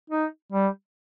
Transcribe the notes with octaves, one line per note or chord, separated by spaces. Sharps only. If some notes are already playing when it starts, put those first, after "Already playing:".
D#4
G3